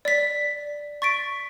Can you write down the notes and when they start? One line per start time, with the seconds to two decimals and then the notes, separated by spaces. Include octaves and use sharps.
0.05 D5 B6
1.02 C#6 A6 B6 D7